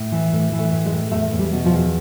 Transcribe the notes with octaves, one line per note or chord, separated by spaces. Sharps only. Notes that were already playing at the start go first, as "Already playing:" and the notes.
Already playing: A2
E3
A2 A3
E3
A3
A2
G#3
A2
E2 A3
E2
G3
B2
F3
E2